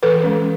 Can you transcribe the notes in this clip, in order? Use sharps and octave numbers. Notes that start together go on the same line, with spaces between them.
E3 A4 B4
G#3 C#4